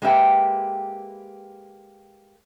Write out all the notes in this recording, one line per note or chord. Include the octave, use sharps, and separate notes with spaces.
G#3 A#3 G4 B4 E5 G5